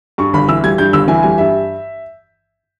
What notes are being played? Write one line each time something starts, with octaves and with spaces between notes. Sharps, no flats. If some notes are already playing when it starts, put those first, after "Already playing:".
G2 C#6
G1 B5
E3 E6
G3 G#6
G2 G6
G1 E6
E3 G#5
G3 G#5
G2 E5